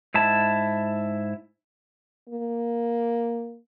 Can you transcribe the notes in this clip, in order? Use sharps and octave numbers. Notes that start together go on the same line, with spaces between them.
G#2 E4 A5
A#3